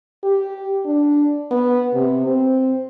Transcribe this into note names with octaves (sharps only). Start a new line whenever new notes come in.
G4
D4
B3
C3
C4